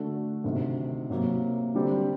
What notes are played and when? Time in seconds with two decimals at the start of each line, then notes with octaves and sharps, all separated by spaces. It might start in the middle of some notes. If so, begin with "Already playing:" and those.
Already playing: D3 A3 D4 F#4
0.44 D2 C3 D#3
1.10 C3 F#3 A#3
1.75 D3 G3 C4 G4